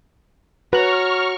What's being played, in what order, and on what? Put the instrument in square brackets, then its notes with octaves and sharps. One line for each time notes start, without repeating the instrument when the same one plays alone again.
[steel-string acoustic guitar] F#4 [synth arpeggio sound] B4 F#6 [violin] C#5 A#5 [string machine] C#6 F6